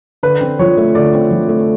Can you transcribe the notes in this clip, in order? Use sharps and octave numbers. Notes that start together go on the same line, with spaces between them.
D3 B4
C4
F3 C#5
A3
D3 D5
C4
F3
A3